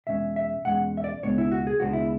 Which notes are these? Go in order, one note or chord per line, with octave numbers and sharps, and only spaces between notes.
E2 B2 G#3 C#4 E5
E5
E2 B2 G#3 C#4 F#5
E5
D5
C#2 B2 G#3 B3 D4 C#5
E4
F#4
G#4
C#2 B2 G#3 B3 D4 F#4
E4